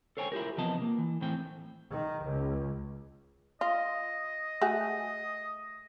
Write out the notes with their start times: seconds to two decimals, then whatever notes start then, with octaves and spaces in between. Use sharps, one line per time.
0.17 A4 C5 C#5 G5 G#5
0.32 E4 F4 G4 A#4
0.57 E2 C3 F3 B3 D#5 A5
0.82 A#3
0.99 E3
1.21 A2 E3 C4 G5
1.92 D#3
2.25 C#2
3.61 F4 D#5
4.61 A3 F#4 G#4